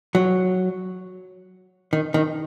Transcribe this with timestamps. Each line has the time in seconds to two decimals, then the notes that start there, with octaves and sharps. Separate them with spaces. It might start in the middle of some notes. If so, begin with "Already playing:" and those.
0.15 F#3
1.93 D#3
2.14 D#3